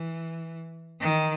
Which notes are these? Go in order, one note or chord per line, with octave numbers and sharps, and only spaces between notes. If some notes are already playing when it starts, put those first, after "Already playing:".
Already playing: E3
D#3